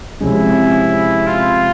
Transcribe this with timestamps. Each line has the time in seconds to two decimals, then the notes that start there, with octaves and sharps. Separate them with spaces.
0.20 C3 F3 G#3 C#4 E4
1.27 F4